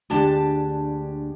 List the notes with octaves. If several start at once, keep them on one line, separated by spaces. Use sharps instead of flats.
D2 G#3 D4 G4 A5